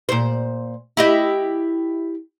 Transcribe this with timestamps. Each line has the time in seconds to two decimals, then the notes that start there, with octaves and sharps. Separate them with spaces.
0.09 A#2 C5
0.97 E4 G4 D#5